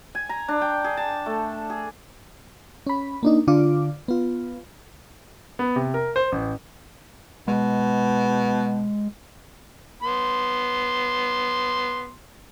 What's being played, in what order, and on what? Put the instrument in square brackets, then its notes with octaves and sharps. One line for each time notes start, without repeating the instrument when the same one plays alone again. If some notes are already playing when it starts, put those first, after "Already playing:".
[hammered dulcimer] G#5
A#5
D4
G5
G#4
A5
A3
G#4
[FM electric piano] C#4 B5
A#3 D4 D#4
D3 D4 F4 D6
B3 F4
[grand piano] B3
C3
A#4
C5
A1
[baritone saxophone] B2 [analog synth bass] G#3
[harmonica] B3 C6